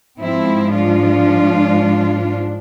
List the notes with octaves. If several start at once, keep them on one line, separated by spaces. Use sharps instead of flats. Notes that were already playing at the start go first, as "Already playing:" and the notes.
G#2 F3 G#3 C4 E4
D4 F4